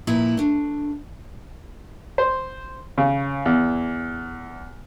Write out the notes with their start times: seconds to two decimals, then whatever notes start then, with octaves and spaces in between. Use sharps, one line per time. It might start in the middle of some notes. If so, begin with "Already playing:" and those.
0.07 A#2 F3 E4 B4 A#5
0.37 A3 D4
2.18 C5
2.98 C#3
3.46 E2